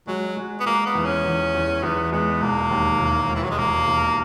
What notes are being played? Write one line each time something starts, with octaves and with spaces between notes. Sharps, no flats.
F#3 G#3
G#3
B3
G#3 A#3
B3
E2
C#4
E2
E2
E2 B3
G#3 B3
E1 A#3
D#2
E1
E1
E3
F#3
G#3
E1 A#3
E1